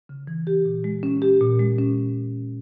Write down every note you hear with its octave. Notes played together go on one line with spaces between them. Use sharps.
C#3
E3
G4
A#2
G#3
C#4
G4
A#2
G#3
C#4